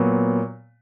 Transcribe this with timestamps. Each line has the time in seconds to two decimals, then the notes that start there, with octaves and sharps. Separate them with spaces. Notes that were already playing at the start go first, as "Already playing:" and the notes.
Already playing: A#2 F#3 B3